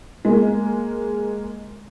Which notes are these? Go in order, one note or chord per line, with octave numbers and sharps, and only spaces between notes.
G#3 A#3